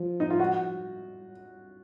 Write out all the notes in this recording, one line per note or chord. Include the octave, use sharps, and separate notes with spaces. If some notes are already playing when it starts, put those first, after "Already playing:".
Already playing: F3
D#4
F4
F#4